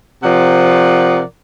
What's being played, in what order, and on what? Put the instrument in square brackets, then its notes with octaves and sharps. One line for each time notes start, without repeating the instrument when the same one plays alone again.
[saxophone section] C3 F3 A#4 D5 F#5